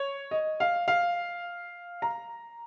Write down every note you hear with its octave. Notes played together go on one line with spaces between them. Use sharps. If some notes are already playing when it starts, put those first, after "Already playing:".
Already playing: C#5
D#5
F5
F5
A#5